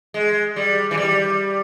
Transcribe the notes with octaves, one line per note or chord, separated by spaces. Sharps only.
G#3
G3
E3
G3